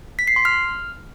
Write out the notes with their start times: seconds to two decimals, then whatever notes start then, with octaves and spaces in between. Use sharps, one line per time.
0.19 B6
0.27 C7
0.36 C6
0.45 F6